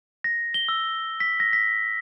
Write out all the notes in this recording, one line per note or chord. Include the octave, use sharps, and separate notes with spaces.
A#6
G7
E6
B6
A#6
B6